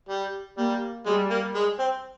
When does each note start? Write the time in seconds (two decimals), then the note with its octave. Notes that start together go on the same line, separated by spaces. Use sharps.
0.09 G3
0.58 G3 A#3
1.06 G3 G#3
1.31 A#3
1.55 G#3
1.79 C4